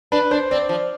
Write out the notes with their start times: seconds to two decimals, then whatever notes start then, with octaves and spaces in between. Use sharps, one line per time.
0.12 D4 B4
0.31 D4 C5
0.51 C4 D5
0.69 F3